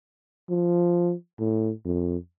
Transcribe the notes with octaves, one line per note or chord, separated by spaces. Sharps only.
F3
A2
F2